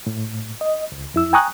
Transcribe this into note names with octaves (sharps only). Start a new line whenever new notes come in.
A2
D#5
C#2
F2 E4 E6
G5 G#5 A#5 C#6 D#6 F#6